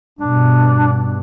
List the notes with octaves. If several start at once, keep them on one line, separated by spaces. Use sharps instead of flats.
G2 B2 D4